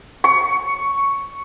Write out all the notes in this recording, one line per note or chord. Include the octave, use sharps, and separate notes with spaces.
C#6